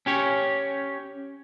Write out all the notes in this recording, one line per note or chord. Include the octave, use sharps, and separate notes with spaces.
C#4 G4 C#5